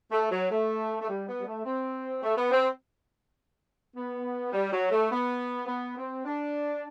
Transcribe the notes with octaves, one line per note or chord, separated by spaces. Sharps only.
A3
F#3
A3
A3
G3
B3
G3
A3
C4
A3
B3
C4
B3
G3
F#3
A3
B3
B3
C4
D4